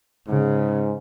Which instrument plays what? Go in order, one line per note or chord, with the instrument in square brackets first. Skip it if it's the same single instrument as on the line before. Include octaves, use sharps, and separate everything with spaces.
[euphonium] G#2 [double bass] C#3